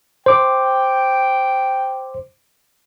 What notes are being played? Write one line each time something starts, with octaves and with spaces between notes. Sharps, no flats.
C5 G5 D6